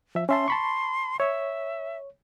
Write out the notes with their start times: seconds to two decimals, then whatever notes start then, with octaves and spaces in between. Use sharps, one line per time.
0.15 F3 E5
0.29 C#4 E5 A5 C6
0.48 A5 B5 C#6
1.20 C#5 E5